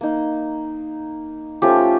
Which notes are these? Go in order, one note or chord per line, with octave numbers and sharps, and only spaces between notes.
A#3 D#4
F3 A3 C#4 F4 G4